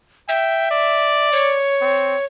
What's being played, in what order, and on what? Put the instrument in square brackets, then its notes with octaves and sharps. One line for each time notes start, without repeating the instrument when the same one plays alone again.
[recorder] E5 [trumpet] G5
[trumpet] D5
[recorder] C#5
[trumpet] C4